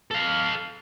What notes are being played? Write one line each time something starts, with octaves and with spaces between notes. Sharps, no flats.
A4 F5